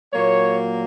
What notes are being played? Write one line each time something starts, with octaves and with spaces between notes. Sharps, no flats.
A#2 F#3 A#3 C#5